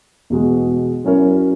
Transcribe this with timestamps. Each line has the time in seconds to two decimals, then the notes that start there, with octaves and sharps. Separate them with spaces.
0.30 E2 B2 G#3
1.05 F#3 C#4 E4 A#4 C#5